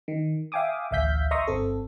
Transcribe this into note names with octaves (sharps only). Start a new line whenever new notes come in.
D#3
E5 F5 G5 G#5 D6 D#6
A1 D2 E5 F5 G6 B6
D#5 E5 A#5 C6 C#6 D#6
G1 C4 A4